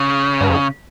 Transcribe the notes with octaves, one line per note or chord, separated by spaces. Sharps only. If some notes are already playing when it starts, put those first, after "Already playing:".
Already playing: C#3
G2
F2